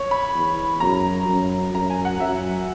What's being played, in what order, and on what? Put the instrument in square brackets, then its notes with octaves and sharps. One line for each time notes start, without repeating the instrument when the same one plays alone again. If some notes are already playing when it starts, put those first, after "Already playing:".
Already playing: [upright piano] C#5
B5
[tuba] E2
[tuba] F#2 [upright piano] A#5
[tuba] F#2
[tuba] F#2 [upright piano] A#5
[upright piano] G#5
F#5
[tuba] F#2 [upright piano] E5